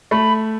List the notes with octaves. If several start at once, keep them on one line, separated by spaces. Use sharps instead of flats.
A3 B5